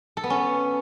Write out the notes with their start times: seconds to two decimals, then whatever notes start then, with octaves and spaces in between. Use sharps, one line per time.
0.17 A4
0.24 B3
0.30 C#4